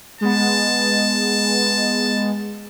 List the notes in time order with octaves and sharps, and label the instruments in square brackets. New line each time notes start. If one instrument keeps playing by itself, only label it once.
[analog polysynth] G#3 B3 [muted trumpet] A5